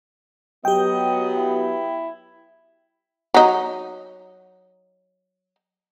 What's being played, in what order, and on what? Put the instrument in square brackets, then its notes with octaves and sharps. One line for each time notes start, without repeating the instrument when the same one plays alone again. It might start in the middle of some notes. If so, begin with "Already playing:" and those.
[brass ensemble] F#3 B3 [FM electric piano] G4 G5 [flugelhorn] D#5
[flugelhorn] E4
[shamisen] F#3 D#4